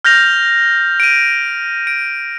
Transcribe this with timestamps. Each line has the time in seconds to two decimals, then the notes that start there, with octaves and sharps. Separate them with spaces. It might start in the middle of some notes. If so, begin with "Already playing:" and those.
0.05 F6 G6 A#6 F7
1.00 D7 D#7
1.87 D7